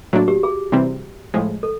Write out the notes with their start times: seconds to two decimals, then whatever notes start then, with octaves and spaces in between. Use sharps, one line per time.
0.13 A2 F#3 A#3 D4 F#4
0.28 G4
0.43 G#4
0.72 C3 E3 G3 C4
1.34 A2 F3 G#3
1.63 A4